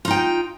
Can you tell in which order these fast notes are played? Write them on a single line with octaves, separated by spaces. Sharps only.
F4 D#4 G5